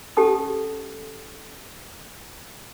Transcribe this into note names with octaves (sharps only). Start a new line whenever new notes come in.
C#4 G4 A4 A5 D#6